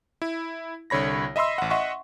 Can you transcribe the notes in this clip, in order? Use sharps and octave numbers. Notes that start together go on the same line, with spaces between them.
E4
C2 D3 C#5 B5 A#6
D#5 E5 B5 C6 E6
A1 F#5
D#5 E5 F#5 C6 C#6